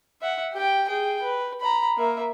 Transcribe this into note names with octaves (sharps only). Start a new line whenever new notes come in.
E5 F#5
G4 G5
G#4 G5
B4
A#5 B5
A#3 E5